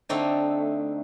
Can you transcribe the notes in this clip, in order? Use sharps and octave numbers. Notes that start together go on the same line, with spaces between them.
D3 A3 C4 D#4